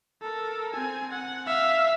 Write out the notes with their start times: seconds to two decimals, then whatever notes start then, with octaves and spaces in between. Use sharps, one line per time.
0.22 A4 A#4
0.73 C4 G#5
1.11 F#5
1.47 E5 F5